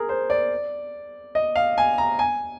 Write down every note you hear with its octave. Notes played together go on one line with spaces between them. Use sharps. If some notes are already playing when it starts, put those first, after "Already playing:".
Already playing: G#4 A#4
C5
D5
D#5
F5
G#5
A#5
G#5